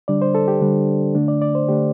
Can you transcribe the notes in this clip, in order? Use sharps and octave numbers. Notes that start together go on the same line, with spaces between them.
D3 G3 D4 D5
C5
A4
G4
D3 G3 D4
D3 A3 D4
D5
D5
C5
D3 A3 D4 G4